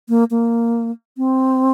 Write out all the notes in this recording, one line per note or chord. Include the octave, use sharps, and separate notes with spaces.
A#3
A#3
C4